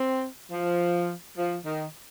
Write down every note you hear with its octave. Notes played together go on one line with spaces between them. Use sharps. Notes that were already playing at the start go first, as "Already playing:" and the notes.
Already playing: C4
F3
F3
D#3